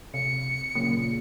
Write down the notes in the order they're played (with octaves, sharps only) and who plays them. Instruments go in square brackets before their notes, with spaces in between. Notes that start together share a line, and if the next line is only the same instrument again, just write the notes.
[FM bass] C3 [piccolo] C#7
[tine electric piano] A#2 C#3 F#3 [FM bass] A#3